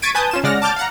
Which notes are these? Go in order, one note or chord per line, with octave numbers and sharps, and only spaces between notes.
C#6 G#6 A6 B6 D7 D#7
B4 G#5 A5 D#6 G6
C#4 F4 E7
C#3 G#3 D5 F#5 F6 A#6
A5 D6 F6 G6 A6
F5 F#5 A#5